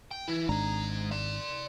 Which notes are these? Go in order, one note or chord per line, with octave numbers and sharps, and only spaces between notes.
G5
E3 E4
G#1 G#2 G#3 D4 A#5
D5 C6